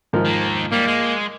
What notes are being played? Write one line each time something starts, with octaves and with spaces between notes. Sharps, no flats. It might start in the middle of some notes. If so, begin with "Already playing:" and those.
G#2 F3 A#4
D#3 A#3
G3 A#3
G#3